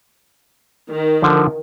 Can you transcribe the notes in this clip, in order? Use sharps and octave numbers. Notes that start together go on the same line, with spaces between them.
D#3
D3 F3